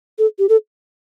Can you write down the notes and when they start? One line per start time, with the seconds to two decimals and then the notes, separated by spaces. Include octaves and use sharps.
0.18 A4
0.39 G4
0.49 A4